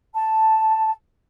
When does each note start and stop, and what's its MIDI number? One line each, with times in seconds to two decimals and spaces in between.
0.15 0.93 81